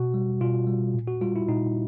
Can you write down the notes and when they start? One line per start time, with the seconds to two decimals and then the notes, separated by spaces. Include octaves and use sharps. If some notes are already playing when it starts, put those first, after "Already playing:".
Already playing: B2 F#4
0.14 G3
0.41 B2 F4
0.67 G3
0.94 A#2
1.07 F#4
1.21 G3 F4
1.36 E4
1.48 A#2 D#4